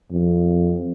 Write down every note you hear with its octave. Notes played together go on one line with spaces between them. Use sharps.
F2